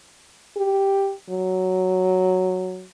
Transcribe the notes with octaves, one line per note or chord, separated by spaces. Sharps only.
G4
F#3